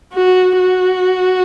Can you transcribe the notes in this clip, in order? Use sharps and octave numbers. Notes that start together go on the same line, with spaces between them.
F#4
F#4